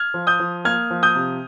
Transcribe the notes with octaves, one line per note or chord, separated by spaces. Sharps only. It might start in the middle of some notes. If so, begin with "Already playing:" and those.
Already playing: F6 G#6
F3
D#6 G6
F3
A#3 F6 G#6
F3
D#6 G6
C3